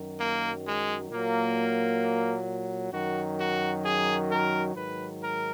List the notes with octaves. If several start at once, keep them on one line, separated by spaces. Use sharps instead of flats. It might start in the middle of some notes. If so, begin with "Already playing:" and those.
Already playing: F#2 D#3 F#3
A#3
G#3
A#2 F#3 A#3
F#2 D#3 F#3 F#4
F#4
G#4
A#4
G#2 D#3 F#3 B4
A#4